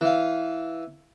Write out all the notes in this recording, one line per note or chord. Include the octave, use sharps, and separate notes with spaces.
E3 F5